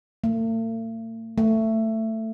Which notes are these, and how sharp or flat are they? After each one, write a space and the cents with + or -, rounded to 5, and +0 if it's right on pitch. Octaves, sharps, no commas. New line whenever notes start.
A3 +45
A3 +15